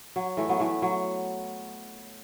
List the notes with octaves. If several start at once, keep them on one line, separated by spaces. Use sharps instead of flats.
F#3
E3 A3
F#3 B3
E3 A3
F#3